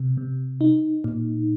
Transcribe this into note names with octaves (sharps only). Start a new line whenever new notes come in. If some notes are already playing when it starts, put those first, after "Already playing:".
Already playing: C3
C3
D#4
A#2